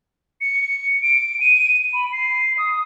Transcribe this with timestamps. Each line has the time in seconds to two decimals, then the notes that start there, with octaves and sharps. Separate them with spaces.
0.41 C#7
1.03 D7
1.40 D#7
1.94 B5
2.12 C7
2.58 D#6